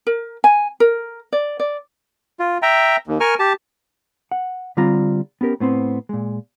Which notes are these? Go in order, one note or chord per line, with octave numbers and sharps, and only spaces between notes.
A#4
G#5
A#4
D5
D5
F4
E5 G5 A#5
D#2
A#4 G#5 C#6 F6
G4 A5
F#5
D3 G3 C4 F4 A#5
B3 C#4 G4 A#4
A2 B3 C4 C5
A#2 G#3